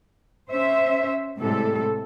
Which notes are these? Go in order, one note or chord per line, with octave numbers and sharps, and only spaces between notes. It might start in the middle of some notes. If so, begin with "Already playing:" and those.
C#4 C5 E5
A2 C3 G3 G#3 A4